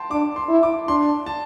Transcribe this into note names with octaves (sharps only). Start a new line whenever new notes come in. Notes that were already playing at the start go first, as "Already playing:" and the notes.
Already playing: G5 A5 C6
D4 D6
C6
E4
D6
D4 C6
A5